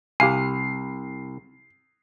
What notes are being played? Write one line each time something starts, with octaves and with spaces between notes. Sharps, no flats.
C2 G4 F5 G#5 C7